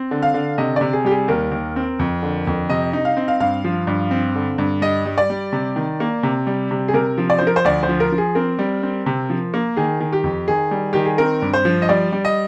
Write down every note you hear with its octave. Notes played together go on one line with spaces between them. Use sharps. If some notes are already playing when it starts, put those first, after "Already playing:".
Already playing: C4
D3
F5
D3
C3 D#5
C3 D5
G#4
G3 G4
G#4
D#2 A#4
D#2
C4
F2
D3
F2
C3 D#5
D#4
F5
C4
F5
G2 F5
F3
G2
C4
D3
G2
G3 D#5
G3
D5
G3
C3
D#3
A#3
C3
G3
C3
G#4
C3 A#4
F3
D5
F3 C5
A#4
C5
D2 D5
C5
F3
A#4
F3
G#4
C4 A#4
G3
C4
C3
F3
A#3
D#3 G#4
D#3
G4
F2
D#3 G#4
G3
D#3 G4
G#4
C4 A#4
G2
C5
F3
D#5
G3 D5
G3
D#5